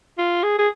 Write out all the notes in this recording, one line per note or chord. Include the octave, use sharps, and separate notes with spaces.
F4
G#4
G#4